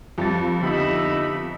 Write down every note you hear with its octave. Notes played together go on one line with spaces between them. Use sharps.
F2 G3 A6
D3 B3 D#4 G4 E5 B5